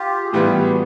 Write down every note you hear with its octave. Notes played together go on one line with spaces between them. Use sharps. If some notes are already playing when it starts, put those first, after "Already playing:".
Already playing: F4 G4
G#4
A2 E3 G3 B3 F4 G4
F#4 G#4